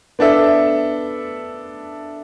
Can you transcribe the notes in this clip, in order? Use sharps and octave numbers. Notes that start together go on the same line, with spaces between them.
B3 D4 A4 E5